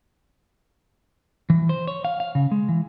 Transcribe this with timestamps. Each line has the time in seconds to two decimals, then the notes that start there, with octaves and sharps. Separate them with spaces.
1.50 E3
1.69 C5
1.88 C#5
2.05 F5
2.20 F5
2.35 C#3
2.51 G#3
2.69 E3